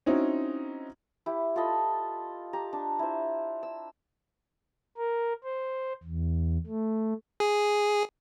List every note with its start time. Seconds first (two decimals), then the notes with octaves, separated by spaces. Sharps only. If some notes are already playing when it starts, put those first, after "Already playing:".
0.06 C4 C#4 D#4 E4 F#4
1.26 E4 G4
1.56 F4 A4 D#5 B5
2.53 G4 A#5
2.73 D4
2.99 E4 C5
3.63 E6
4.98 A#4
5.44 C5
6.03 E2
6.67 A3
7.40 G#4